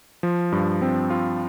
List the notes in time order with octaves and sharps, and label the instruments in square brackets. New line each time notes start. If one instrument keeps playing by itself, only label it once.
[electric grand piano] F3
G2
C4
F4